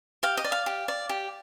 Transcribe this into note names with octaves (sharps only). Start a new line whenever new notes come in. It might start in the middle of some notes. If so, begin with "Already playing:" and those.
G4 F5
D#5
D5
F5
G4
D5
G4